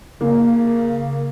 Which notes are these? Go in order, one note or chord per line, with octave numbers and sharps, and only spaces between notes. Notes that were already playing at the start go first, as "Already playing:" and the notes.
C#3 A#3